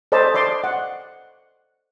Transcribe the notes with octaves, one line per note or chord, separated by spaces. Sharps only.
A4 C5 D5 D#5 A5 B5
D5 D#5 C6 D6
F#5